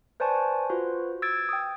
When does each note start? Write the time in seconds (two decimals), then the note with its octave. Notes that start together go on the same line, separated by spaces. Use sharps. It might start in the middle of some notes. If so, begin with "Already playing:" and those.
0.20 B4 C5 D5 G#5 A5 C#6
0.70 F4 F#4 B4 C5
1.22 E6 G#6 A6 D7
1.49 G5 D#6